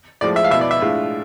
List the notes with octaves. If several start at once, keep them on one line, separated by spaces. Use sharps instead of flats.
A2 F3 G#3 D5
E5
F5
B2 B3 E4 E5
D5
E5
A2 G#3 D4 F4